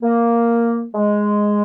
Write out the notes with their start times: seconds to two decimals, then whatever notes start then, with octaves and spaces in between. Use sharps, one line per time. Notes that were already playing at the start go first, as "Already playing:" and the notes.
0.03 A#3
0.95 G#3